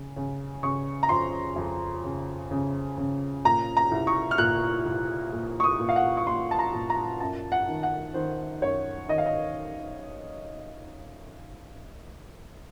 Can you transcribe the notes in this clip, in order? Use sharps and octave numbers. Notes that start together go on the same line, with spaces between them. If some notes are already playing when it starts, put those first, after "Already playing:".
Already playing: C#3
C#3
C#3 C#6
A#5
F2 C6
F2
C#3
C#3
C#3
A#2 A#5
A#5
C2
C#6
F6
A#2 F#6
C2
A#2
C#6
D#6
A#2
F5
F#5
C#6
A#2 C6
A5
A#5
A#2
A#5
F#2 A5
F#5
D#3
F#5
D#3 C5
F#2 C#5
D#3 D#5
F5
D#5